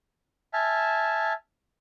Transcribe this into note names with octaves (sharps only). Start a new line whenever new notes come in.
E5 G#5 A5 F6